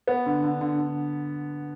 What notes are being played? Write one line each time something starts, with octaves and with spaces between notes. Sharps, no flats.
B3
D3
D3
D3
D3